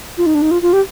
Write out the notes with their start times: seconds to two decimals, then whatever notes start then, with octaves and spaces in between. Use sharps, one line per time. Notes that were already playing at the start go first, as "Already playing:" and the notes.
0.18 F4
0.26 D#4
0.35 D4
0.42 D#4
0.51 F4
0.62 F4
0.73 G4